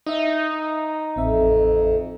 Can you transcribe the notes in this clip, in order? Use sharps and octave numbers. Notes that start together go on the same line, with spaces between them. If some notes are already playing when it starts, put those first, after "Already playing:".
D#4 D#5 E5
A1 F2 C4 E5